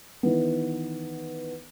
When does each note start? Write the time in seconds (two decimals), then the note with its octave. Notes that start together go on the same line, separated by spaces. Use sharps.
0.23 D#3 E3 B3